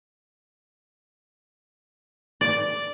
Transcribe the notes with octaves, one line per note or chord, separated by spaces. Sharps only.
D5